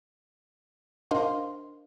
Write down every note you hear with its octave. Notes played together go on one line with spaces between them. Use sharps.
D4 A#4 C5 D#5 F5 C6